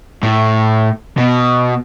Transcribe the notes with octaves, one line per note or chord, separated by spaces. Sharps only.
A2
B2